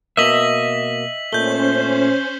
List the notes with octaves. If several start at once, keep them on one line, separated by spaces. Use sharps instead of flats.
B2 A#3 D#5 E5 B6 F#7
A#2 A3 C#4 C5 G6 G7